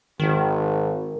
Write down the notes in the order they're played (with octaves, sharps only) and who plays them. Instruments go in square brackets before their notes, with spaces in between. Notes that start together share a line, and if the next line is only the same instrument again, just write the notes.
[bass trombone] G#1 [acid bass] D#3